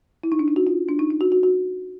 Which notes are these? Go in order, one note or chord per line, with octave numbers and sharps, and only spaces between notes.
E4
D#4
D4
D#4
F#4
F4
D4
D#4
D#4
F#4
F#4
F#4